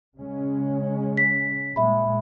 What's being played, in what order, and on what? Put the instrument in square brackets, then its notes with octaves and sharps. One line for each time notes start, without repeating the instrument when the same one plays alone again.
[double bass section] C#3 G#3 C#4
[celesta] B6
[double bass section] A#2 G#3 [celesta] E5 B5